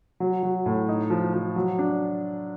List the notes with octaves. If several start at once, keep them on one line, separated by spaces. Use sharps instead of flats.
F#3
F#3
A2
D#4
F3
F3
F#3
D4